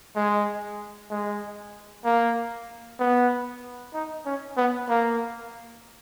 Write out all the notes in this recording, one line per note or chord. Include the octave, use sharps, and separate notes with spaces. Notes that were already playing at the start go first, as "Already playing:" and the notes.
G#3
G#3
A#3
B3
D#4
C#4
B3
A#3